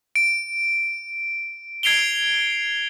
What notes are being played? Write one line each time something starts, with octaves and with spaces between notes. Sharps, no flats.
D7
G#6 C7 D7 F7 G7